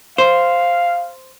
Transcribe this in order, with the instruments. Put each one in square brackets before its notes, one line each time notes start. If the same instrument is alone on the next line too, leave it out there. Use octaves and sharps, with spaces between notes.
[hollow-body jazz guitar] C5 [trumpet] F5